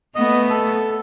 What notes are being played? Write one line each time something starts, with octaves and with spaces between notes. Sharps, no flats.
A3 B3 D#5
A4